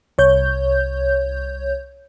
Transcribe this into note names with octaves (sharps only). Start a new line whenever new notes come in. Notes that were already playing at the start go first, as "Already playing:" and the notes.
C2 C#5 G6